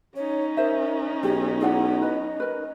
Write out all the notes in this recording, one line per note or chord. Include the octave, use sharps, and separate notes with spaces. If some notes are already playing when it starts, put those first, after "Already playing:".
C#4 D#4 C#5
A#4 C5 E5
B1 G4 G#4
E4 G#4 D5 F#5
B4 D#5
A#4 B4